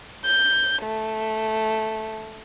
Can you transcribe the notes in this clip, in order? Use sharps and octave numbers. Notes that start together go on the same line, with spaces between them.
G6
A3